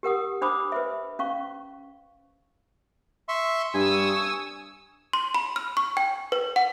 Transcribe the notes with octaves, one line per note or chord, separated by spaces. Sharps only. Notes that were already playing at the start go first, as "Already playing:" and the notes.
G4 A#4 F#5 D#6
D4 C5 B5 D6 D#6
B4 C5 E5
C#4 F5 C#6
E5 C6 C#6
G2 G#5 C#6 D#6 E6
C6
B5
F6
C#6
G5
B4
F#5